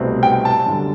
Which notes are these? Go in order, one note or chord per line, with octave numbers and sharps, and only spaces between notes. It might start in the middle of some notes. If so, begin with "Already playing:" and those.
Already playing: C2 B2 A3 C4
G5
A5
F#2 D3 G3